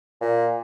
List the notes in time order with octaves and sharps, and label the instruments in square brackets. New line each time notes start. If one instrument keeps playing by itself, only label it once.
[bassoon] A#2